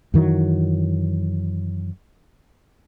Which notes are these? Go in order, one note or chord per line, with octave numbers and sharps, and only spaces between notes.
F#2 D#3 E3 F#3